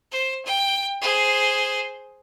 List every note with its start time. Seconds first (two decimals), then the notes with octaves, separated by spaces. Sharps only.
0.11 C5
0.45 G5
1.02 G#4 C5